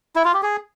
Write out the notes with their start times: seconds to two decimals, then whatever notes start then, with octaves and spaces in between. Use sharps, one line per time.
0.16 E4
0.25 F4
0.34 G4
0.42 G#4